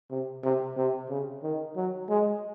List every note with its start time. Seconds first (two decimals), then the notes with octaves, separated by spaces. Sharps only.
0.11 C3
0.44 C3
0.77 C3
1.09 C#3
1.43 D#3
1.76 F#3
2.09 G#3